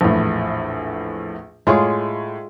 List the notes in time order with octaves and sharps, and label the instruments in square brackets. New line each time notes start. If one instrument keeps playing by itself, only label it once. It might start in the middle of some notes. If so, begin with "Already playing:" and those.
[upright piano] A#1 E2 A2
[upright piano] A2 C#5 [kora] G#3 F4 G#4